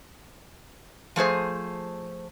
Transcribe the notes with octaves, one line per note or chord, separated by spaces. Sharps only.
F3 A3 G#4 C5